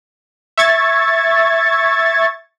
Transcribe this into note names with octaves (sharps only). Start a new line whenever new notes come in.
E5 C#6 G#6 A6